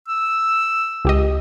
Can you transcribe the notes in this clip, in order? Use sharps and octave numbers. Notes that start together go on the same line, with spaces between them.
E6
C#2 G4 D#5